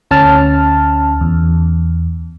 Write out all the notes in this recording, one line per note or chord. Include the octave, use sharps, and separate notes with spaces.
D2 C#4 A5 F6
E2